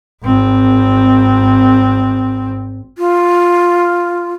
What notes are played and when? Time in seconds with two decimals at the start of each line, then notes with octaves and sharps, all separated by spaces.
0.24 G#1 C4
2.98 F4